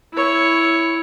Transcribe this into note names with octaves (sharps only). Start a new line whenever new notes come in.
E4 C#5